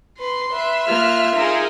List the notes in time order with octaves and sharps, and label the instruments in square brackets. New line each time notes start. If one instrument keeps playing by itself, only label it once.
[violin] B4 [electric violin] C6
[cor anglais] B4 [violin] E5
[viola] A#3 [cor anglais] F4 [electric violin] F6 F#6
[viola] D#4 [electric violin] G#4 A#4